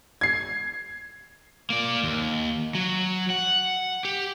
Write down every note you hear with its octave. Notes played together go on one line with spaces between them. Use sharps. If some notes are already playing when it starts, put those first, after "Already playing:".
G#6 C7
A#3 D5
D#2
F#3
F#5
G4